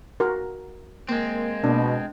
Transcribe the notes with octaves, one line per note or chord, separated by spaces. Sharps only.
F#4 A#4
G#3 A#3 C4
B2 D4